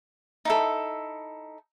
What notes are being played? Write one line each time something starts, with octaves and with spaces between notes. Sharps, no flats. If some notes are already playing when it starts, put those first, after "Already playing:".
D#4 E4 A4